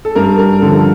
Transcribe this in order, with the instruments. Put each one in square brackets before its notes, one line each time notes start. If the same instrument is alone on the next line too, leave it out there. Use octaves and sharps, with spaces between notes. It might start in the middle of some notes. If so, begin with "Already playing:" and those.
[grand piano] A4
G2 A#4
A#4
D3 F3 A4